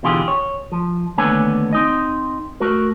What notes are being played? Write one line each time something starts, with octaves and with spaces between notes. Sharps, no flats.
B2 D3 E3 F4 G4 G#4
C#5
F3
D#2 D3 A3 B3 C#5 G#5
C4 D#4 D#5
A3 F#4 A#4